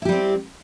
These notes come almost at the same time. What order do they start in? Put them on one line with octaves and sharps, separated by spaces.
E4 G4 G3 C4